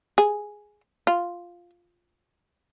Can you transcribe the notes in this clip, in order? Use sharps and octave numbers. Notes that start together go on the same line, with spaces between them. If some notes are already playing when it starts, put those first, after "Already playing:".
G#4
F4